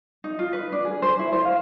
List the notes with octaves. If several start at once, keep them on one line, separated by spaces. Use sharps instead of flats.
D#4
F4
B4
D4
G#4
C5
E4
C5
F5